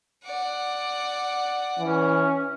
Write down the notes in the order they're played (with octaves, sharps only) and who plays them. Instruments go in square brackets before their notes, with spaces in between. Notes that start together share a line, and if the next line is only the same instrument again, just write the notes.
[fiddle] D5 F#5
[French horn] E3 [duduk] C#4